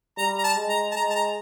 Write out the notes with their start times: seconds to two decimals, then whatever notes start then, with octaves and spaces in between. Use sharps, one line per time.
0.18 G3 A#5
0.38 A#5
0.43 A5
0.56 G#3
0.69 A#5
0.91 A5
0.96 G#3 A#5
1.10 A5
1.15 A#5